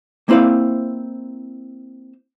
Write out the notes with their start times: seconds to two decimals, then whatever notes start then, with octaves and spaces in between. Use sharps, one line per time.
0.29 A#3 C4 E4 C5 F5